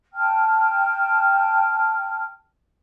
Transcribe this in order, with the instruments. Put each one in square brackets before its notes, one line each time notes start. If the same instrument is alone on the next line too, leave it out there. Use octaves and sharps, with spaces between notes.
[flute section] G5 A5 F6